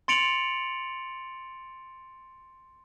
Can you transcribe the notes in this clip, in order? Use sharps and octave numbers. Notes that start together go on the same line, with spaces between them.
C6 A6 C#7 D7 F7 F#7